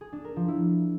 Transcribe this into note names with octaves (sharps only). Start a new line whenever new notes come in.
G#4
D4
A#4
F3
E4